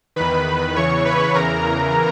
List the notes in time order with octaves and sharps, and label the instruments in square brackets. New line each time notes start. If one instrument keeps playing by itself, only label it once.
[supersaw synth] E2 D#3 B4 B5
E2 C#3 E3 C#5 C#6
B4 B5
E2 C#3 E3 A#4 A#5